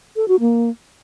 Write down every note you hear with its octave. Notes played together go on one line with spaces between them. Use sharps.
A4
F#4
A#3